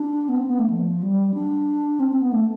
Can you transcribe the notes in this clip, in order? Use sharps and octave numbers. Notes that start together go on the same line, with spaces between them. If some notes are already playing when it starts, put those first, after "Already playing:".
Already playing: D4
B3
C4
B3
A3
F3
G3
D4
C4
C4
B3
A3